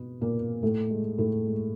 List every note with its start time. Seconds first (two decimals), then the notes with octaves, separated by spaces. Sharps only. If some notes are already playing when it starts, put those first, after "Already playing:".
Already playing: B2 B3
0.21 A#2 A#3
0.62 A2 A3
0.90 G#3
1.18 A2 A3
1.46 G#3